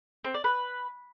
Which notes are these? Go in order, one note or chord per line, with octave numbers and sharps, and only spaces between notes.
C4
D5
B4